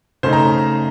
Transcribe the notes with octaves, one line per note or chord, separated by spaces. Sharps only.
C#3 A3 D#4 C5
A#5